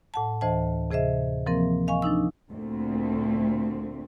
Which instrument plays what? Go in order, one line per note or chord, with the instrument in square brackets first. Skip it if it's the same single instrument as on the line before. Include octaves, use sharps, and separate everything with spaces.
[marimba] A2 F#5 A5
D2 E3 C5 D#5 A5
C3 G#4 C5 D#5 E5
E3 F3 A#3 C4 A#4
D#5 F5 G#5 C#6
F3 D4 D#4 E6
[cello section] D2 A#2 A3 C4